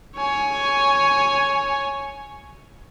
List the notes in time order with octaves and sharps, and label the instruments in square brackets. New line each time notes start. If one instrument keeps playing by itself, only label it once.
[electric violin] C#5 G#5